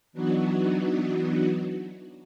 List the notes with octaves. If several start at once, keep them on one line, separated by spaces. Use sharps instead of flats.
E3 F#3 B3 D4 D#4 F#4